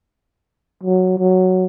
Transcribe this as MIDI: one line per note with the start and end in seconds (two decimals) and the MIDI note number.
0.83 1.15 54
1.18 1.65 54